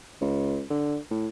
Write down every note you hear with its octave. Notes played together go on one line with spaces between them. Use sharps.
C#2
D3
A2